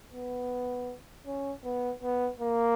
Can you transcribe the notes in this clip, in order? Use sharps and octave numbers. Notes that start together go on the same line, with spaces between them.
B3
C#4
B3
B3
A#3